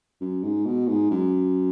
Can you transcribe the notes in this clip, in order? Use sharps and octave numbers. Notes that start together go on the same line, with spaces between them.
F#2
G#2
B2
G#2
F#2